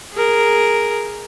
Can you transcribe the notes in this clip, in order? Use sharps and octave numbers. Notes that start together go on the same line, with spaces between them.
G#4 A#4